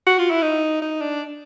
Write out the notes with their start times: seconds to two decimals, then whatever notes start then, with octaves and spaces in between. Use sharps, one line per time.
0.07 F#4
0.19 F4
0.31 E4
0.42 D#4
0.82 D#4
1.01 D4